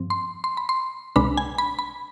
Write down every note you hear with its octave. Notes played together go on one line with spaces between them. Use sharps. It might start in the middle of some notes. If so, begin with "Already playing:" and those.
Already playing: G2 F3 C4
C6
C6
B5
C6
C2 B2 G#3 D4 B5
G#5
B5
B5